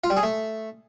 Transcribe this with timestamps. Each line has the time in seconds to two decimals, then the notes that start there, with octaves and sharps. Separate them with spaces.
0.04 F4
0.10 G3
0.17 G#4
0.23 A3